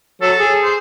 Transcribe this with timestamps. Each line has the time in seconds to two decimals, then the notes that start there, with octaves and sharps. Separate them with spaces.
0.22 F#3 A4
0.38 G#4
0.63 C5